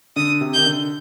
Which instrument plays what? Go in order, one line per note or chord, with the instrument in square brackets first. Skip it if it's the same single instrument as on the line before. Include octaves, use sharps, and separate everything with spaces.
[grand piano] D3 [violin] D#6
[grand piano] C3
[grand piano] D#3 [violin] G6
[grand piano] D3